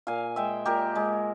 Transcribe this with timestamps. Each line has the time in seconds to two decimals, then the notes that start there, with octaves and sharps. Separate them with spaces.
0.07 A#2 F5 G#5
0.36 G#3 E5 G5
0.65 A#2 G4 A#4
0.95 G#3